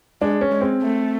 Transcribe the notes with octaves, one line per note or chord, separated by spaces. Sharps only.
G#3 D4
C#4
G#3
C4
A3